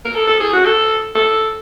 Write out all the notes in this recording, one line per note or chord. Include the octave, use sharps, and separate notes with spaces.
A#4
A4
A4
G#4
F#4
A4
A4